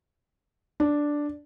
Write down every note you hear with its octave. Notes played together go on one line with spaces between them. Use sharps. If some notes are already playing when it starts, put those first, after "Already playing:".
D4